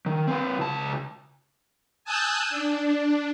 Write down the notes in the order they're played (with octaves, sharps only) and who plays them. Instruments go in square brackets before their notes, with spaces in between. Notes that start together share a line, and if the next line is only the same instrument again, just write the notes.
[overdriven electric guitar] D#3
C4 B4
C#2 A5
[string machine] G#5 A5 D#6 E6 F#6 G6
D4